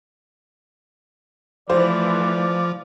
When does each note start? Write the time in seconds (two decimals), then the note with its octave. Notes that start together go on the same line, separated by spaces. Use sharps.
1.70 E3 F3 A3 C5 D5